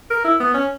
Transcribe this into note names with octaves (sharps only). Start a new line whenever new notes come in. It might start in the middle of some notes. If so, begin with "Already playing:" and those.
A#4
E4
B3
C#4